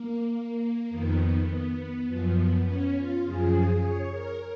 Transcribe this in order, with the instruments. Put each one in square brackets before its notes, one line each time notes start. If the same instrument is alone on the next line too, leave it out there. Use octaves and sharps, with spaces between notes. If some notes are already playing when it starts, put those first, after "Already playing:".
Already playing: [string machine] A#3
F2 D#3 B3
F#2 F3
C#4
F4
F#2 C#3 F3 G#4
C#5
A#4